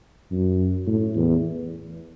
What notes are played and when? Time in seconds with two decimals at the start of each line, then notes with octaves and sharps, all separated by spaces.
0.31 F#2
0.87 A2
1.16 E2